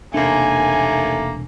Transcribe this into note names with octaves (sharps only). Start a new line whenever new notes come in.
E1 D#2 C3 A3 A#3 D4 G#5